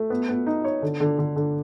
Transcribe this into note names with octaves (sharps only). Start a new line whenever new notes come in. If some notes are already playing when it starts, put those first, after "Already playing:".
Already playing: A3
B3
B3
D#4
C#5
D3
D3
D3
D3